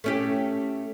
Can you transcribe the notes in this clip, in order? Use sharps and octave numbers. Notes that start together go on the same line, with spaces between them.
A3 C#4 G4